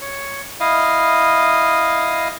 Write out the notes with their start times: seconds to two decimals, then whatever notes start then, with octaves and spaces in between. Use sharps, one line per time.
0.01 C#5
0.60 E4 D#5 F5